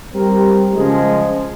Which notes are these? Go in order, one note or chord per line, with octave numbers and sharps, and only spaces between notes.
G3 C4 G4 A#4
C#3 F3 G#3